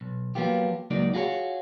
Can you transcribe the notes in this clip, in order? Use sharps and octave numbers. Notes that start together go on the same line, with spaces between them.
B1
F3 F#3 A#3 B3 F4 G4
C#2 F#3 A#3 D#4 D5
F4 F#4 G#4 A#4 C#5